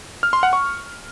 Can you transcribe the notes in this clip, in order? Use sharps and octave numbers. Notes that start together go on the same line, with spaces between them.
F6
C6
F#5
C#6